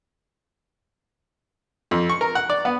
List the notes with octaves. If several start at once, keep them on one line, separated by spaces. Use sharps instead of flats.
F2
C#6
A#4
F#5
D5
B3